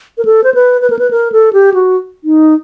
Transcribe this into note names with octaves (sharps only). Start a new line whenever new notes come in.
A#4
A4
C5
B4
B4
A#4
B4
A#4
A4
G4
F#4
D#4